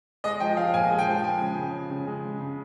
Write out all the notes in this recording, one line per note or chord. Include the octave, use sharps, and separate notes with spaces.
G#3 D#5
F3 G5
F3 F5
A#2 G#5
G#3
G5
F3
G#3 G#5
C#3
C#3
C#3
C#3
G#3
C#3
C#3